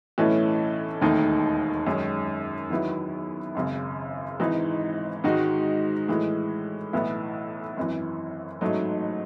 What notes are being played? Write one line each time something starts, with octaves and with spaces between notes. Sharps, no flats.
B1 A2 E3 A3 C#4
E1 D#2 D#3 A3 D#4
F#2 D#3 G#3 C#4
E2 D#3 F#3 B3 E4
G#1 F#2 C#3
G#1 G#2 E3 G#3 D#4
G#2 D#3 G#3 D#4 F#4
A2 E3 G#3
B1 A2 E3 B3 E4
G#1 F#2 E3
A1 G#2 F#3 A3 D#4